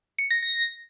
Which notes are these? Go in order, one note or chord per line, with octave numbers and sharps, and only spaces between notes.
C#7
A#6
A#6